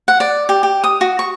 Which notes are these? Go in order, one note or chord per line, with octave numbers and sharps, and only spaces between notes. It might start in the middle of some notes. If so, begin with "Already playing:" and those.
F#5
D5
G4
G4
D#6
F#4
C#6